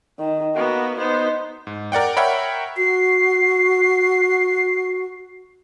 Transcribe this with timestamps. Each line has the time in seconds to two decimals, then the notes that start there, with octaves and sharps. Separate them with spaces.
0.20 D#3
0.55 A#3 B3 F#4
0.98 B3 D#4 C5
1.67 G#2
1.92 A#4 D5 F#5 G5
2.17 A#4 C#5 E5 F#5 G5 B5
2.76 F#4 C7